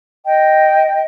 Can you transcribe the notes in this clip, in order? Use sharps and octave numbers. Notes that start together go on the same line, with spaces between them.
D#5 G5